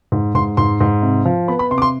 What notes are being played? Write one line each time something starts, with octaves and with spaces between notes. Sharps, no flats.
G#2
G#2 C6
G#2 C6
G#2
C3
F3
B3 B5
B5
C3 C6
D6
C6